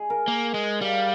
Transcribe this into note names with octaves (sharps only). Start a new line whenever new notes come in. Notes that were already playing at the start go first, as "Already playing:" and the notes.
Already playing: G#4
A#4
A#3
G#3
G3 F5